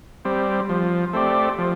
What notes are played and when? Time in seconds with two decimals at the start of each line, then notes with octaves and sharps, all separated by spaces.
0.25 G3 C4
0.69 F3
1.13 A3 C4 G4 D5
1.58 F3